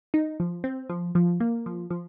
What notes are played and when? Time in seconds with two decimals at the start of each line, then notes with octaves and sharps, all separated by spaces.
0.14 D#4
0.40 F3
0.64 C4
0.89 F3
1.15 F3
1.40 A#3
1.66 F3
1.90 F3